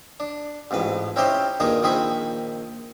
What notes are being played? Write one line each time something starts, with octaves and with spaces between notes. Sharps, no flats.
D4
A1 F2 G#2 B4
C4 C#4 D#4 E4 G4 C5
G2 A#2 D#3 D#4 G#4
A#1 D#3 C4 G#4 B5 C#6